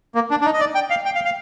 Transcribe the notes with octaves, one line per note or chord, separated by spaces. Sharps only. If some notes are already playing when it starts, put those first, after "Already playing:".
A#3
D4
D4
D#4
D#5
D5
G5
F5
G5
F5
F5